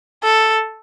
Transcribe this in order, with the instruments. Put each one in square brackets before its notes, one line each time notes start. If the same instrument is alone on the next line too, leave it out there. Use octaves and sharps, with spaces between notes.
[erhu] A4